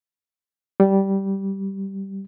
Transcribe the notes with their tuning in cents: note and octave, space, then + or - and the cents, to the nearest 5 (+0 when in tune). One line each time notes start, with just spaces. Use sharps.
G3 -10